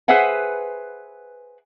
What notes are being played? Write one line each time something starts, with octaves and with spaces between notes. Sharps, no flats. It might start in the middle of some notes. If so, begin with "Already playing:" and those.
G#4 B4 C5 E5 F#5 G#5